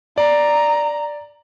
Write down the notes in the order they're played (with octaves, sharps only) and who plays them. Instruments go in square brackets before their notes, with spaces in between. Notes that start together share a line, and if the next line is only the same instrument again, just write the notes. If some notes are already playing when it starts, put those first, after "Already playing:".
[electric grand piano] D5 [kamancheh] A#5